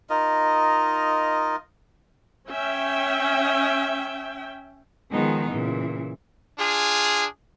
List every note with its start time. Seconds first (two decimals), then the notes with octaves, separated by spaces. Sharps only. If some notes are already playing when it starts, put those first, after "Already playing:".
0.10 D#4 F4 A#4 D#5
2.49 C#4 E5 G5
5.12 D#3 F3 G#3 B3 D#4 G#4
5.50 A#2 C#3 E3
6.58 D4 F4 G#4